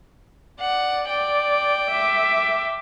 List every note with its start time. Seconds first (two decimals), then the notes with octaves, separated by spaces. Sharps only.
0.61 D5 F#5
1.10 D5 G5
1.91 E5 D6